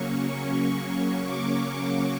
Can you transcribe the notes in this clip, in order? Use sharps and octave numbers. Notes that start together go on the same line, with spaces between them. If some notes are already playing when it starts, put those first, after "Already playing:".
Already playing: C#3 F#3 A#3 C#4 C#6
C#6
D6